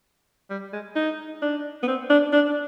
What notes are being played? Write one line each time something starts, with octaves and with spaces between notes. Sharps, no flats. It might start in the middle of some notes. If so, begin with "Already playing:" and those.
G3
G#3
D#4
D4
B3
C4
D4
D4